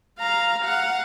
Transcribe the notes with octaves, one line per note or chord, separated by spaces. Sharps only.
F5 A#5
F5 F#5